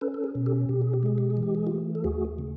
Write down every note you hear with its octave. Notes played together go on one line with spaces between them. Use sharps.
C#4 A4 B4
A4
G#4 A#4
B2
G4 A4
B2 G4
G#4
G4
G#3 G#4
G4
G#4
E3
G4
G#4
A3 F4 G4
A4
D#2 F#4 G#4
C#3